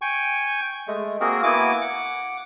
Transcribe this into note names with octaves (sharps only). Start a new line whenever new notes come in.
G5 G#5 C#6
G#3 A3
A#3 C4 F#4 G#4 A#4
A#3 B3 E4 F#4 G#5 D6
F#5 D6